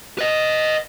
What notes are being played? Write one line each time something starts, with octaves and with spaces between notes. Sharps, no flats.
B4 D#5